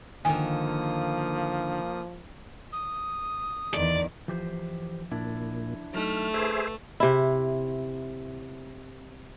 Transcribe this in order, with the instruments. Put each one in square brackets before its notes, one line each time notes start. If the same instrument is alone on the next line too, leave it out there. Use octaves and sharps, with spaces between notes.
[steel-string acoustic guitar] D3 D#3 [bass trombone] F3 [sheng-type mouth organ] A#3 D#6 [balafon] G#5
[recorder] D#6
[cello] E2 D#3 [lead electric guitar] D5
[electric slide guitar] E3 G4 C5 [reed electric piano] F3
[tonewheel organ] A#2 [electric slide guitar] D4 E4
[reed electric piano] F#3 D#4 [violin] A3 [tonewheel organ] F6
[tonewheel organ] G#4 C5 E5 [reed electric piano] B4 E6
[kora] C3 E4